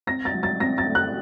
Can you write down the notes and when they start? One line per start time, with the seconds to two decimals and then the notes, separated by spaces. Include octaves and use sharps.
0.07 C4 A#6
0.25 A6
0.34 F#3
0.43 A6
0.60 C4 A#6
0.78 A6
0.87 A3
0.95 F#6